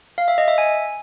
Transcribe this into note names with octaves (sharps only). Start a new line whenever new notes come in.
F5
E5
D#5
E5
G#5